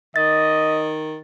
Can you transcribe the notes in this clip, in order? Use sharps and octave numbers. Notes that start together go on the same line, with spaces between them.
D#3 D#5 A6